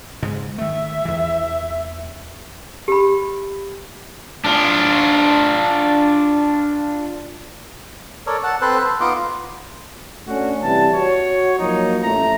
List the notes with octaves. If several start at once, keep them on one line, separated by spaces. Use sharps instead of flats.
G#2 C#3 G#3
D#3 A3 E5
E2 E3
G4 B5
D4 F4
A4 A#4 C#5 D5
F#5 A5
C4 A4 B4 C5 C6 F#6
B4
B3 D#4 F4 D#5 C6 D6
A3 C#4 D4 F#4
C3 E3 G3 A5
F#4 C#5
F3 F#3 A#3 D#4
A1 A3 C#4 A#5